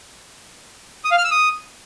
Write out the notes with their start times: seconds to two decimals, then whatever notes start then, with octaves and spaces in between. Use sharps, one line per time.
1.04 D#6
1.11 F5
1.18 F6
1.24 E6
1.31 D#6